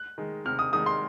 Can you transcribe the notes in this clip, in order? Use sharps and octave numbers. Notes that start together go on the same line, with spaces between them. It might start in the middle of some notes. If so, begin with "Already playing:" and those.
Already playing: F#6
D#3 G#3
C3 F6
D#6
D#3 G#3 D#6
C6